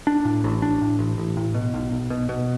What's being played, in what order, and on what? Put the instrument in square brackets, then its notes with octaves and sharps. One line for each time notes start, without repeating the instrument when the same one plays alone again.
[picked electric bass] D4
A2
A1
D4
A2
A1
A1
A2
B2
B1
B1
B2
B2